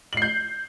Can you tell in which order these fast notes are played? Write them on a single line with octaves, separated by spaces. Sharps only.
F#7 C7 G6